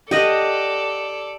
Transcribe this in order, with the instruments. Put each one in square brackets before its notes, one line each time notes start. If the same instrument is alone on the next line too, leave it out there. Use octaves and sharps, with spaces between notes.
[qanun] G4 D#5 F#5 [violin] A4 D5